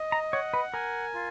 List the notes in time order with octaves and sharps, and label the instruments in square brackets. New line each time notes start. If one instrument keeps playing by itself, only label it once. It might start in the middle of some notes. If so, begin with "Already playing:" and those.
Already playing: [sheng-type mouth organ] D#5
[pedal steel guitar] A#5
[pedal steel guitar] C#5 [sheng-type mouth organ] F#5
[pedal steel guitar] B4
[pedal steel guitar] A#4 [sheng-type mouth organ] G#5
[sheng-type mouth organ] F4